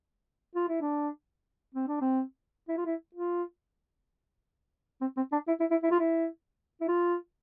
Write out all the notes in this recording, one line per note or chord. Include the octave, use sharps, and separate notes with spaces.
F4
E4
D4
C4
D4
C4
E4
F4
E4
F4
C4
C4
D4
E4
E4
E4
E4
F4
E4
E4
F4